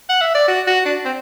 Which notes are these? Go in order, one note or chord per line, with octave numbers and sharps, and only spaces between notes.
F#5
E5
D5
F#4
F#4
D4
C4